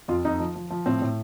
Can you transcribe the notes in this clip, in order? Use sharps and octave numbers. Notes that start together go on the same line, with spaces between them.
F2 F4
F2 D#4
F3
F3
F3
A2 C4
A2